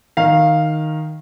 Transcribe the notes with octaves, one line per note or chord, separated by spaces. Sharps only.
D#3 F5